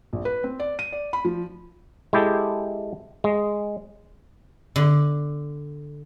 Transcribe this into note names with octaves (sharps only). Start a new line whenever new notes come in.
A#1
B4
C4
D5
D#7
D5
B5
F3
G#3 E4 G4 A4
G#3
D3